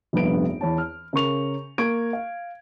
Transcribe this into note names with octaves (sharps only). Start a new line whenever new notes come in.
F1 A#1 G2 B3 D7
E2 C#5 A5
F6
C#3 A#4 C#6 F7
A#3 C#6 G#6 D7
F5